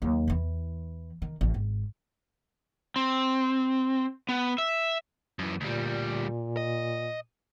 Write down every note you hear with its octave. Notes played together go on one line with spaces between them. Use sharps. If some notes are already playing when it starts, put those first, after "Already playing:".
D#2 F#3
E2 E3
D#3
A1
G#1
C4
B3
E5
F#2 E3
D2 A#2 G3
D#5